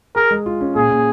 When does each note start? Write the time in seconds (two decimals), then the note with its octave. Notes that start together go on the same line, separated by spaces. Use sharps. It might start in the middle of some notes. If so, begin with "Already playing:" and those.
0.16 G#4 A#4
0.31 G#3
0.46 F4
0.61 C#4
0.75 A#2 G#4
0.91 A#2